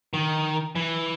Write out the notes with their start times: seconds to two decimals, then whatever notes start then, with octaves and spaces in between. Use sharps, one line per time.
0.13 D#3
0.75 E3